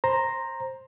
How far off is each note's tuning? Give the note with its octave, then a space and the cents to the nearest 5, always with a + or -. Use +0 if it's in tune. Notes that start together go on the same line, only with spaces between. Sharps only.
C5 +10 A#5 +0